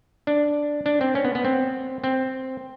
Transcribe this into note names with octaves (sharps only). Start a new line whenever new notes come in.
D4
D4
C4
C#4
B3
B3
C4
C4